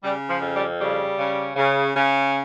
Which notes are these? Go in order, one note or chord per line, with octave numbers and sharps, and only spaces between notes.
C#3 G3
F3
F2
G3
C#3 G3
C#3
C#3
C#3